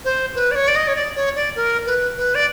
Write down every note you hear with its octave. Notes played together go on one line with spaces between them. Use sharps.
C5
B4
D5
C#5
D5
D#5
C#5
D5
C#5
D5
A#4
B4
B4
D5